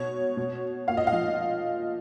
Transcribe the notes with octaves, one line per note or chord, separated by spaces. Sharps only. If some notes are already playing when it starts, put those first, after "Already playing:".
Already playing: B2 C#5
B2
A#2 F5
D#5
F5
F3